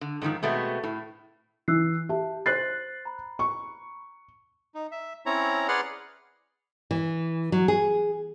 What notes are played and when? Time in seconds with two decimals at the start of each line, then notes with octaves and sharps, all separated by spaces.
0.01 D3
0.22 G#2 D3 D#3 F3
0.43 B2 G#3 A3 B3 C4
0.84 A2
1.68 E3 E6 F#6 C7
2.09 G4 E5 A5
2.46 C5 F#6 A6 C7
3.05 A#5 B5
3.39 C#6
4.74 D#4
4.91 E5
5.26 C4 C#4 E4 C#5 A#5
5.68 G#4 B4 D5 F#5 C6 F6
6.91 E3
7.52 F#3
7.68 G#4